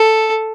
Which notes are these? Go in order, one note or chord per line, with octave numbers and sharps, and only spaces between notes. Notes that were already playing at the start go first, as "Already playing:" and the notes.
Already playing: A4